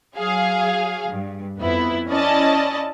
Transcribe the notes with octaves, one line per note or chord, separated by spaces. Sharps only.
F#3 G#4 F5
G2
F2 B3 E4
C#4 E4 D5 D#5 A5